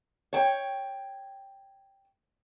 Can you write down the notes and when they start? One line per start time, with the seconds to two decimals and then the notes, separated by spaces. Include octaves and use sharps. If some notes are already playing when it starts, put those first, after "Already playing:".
0.33 C#5 G5